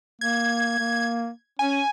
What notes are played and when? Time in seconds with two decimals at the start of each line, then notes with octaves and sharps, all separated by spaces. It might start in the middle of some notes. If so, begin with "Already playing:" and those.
0.21 A#3 G#6
0.79 A#3
1.59 C#4 G#5